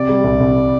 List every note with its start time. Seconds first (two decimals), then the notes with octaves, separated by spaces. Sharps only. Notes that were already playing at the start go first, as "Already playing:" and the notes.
Already playing: C3 D5
0.09 G3
0.24 C2
0.40 C2